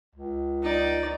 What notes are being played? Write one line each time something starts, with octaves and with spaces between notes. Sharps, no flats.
C#2
D#4 D5